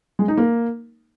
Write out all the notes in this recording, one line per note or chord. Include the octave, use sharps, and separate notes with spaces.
G#3
D#4
A#3